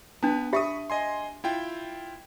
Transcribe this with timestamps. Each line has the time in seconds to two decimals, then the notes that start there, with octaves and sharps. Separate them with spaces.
0.23 B3 D4 B4 A5
0.53 G4 E5 B5 C#6 D#6
0.90 D#5 G#5 C6
1.44 E4 F4 G5